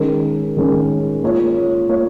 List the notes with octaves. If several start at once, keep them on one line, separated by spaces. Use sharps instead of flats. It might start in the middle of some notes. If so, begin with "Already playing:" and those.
Already playing: D#3 G#3 C#4 A#4
D#3 G#3 C#4 A#4
A#3 F4 C#5
A#3 F4 C#5